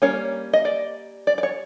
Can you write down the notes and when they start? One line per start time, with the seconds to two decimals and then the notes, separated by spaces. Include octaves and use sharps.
0.02 G3 A#3 C#4 C#5
0.53 D#5
0.65 D5
1.27 D5
1.38 D5
1.43 C#5